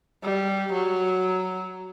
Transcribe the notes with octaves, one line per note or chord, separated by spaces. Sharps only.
G3
F#3